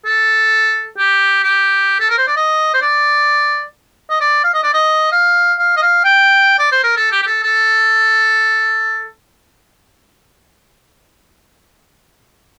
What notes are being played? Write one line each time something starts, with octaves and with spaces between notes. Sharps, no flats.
A4
G4
G4
A4
A#4
C5
D5
D#5
C5
D5
D#5
D5
F5
D#5
D5
D#5
F5
F5
D#5
F5
G5
D5
C5
A#4
A4
G4
G4
A4
A4